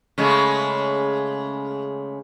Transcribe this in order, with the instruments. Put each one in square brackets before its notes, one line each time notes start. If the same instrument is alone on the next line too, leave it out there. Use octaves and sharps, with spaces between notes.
[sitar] C#3 G#3 A3